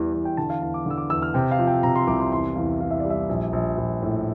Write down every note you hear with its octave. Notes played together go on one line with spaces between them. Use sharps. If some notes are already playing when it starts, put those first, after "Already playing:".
Already playing: E2 E3 G3
E2
G5
D3 A5
F5
E2 A5
D6
D3 E6
D6
E2 E6
F6
C3 G5
F5
F3
G5
C3 A#5
C6
C2 D6
C6
E2 C6
E2 F5
E2 F5
E5
G3 D5
E5
A#1
A#1
A#1
A2